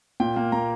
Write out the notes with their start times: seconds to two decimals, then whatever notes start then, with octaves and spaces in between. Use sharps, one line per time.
0.20 A#2 G5
0.36 A#3
0.52 A#3 A#5